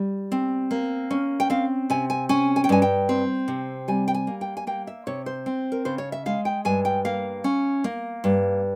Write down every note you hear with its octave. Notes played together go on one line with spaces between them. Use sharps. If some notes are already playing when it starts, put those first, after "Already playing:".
Already playing: G3
C4
A#3
C#4
G5
C4 F5
C3 G#5
G#5
C#4 G#5
G#5
G5
G2 G#5
G5
C4
C3
G3 G#5
G5
G#5
A#3
G5
G#5
A#3 G5
E5
C3 C#5
C5
C4
A#4
C#3 C5
C#5
E5
G#3 F5
G5
G2 G#5
G5
A#3 F5
C#4
A#3
G2